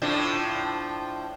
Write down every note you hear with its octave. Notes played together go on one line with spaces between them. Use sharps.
A2 F3 D4